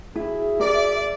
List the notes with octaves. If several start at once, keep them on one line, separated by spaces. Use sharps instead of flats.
E4 F#4 G#4 E5
A#4 D5